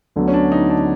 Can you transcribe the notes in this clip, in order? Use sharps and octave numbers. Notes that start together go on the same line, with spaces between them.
D2 D3 F#3 B3
C#4
D4
D#4
D4